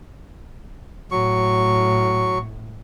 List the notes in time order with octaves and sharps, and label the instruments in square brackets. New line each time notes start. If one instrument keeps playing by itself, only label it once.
[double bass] A2 [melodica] F#3 C#6